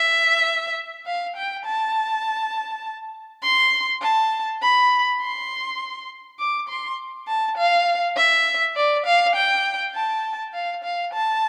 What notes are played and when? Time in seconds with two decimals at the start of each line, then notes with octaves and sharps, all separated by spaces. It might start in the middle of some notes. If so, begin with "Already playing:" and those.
Already playing: E5
1.06 F5
1.36 G5
1.65 A5
3.43 C6
4.01 A5
4.61 B5
5.20 C6
6.39 D6
6.68 C6
7.28 A5
7.58 F5
8.16 E5
8.76 D5
9.06 F5
9.36 G5
9.95 A5
10.54 F5
10.84 F5
11.13 A5